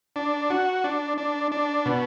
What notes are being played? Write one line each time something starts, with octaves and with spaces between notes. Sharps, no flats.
D4
F#4
D4
D4
D4
B2